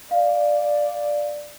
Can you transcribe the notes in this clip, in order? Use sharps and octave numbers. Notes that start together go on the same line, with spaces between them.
D5 F5